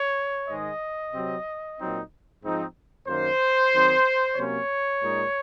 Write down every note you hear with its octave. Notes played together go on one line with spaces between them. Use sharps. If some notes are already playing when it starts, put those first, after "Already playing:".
Already playing: C#5
G#2 D#3 G#3 D#5
C3 F#3 C4
A#2 F#3 C4 D#4
G#2 F3 C4 D#4
F#2 D#3 A#3 C5
D#3 F#3 C4 D#4
C3 F#3 A#3 C#4 C#5
A#2 G#3 D#4